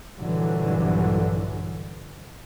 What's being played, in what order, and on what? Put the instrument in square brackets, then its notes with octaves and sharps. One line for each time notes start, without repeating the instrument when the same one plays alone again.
[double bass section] A#1 G2 D3 E3 F#3